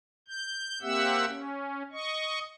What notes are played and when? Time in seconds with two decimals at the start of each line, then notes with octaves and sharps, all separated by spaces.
0.28 G6
0.82 A#3 C4 G4 E5 F#5 E6
1.27 C#4
1.92 D#5 C#6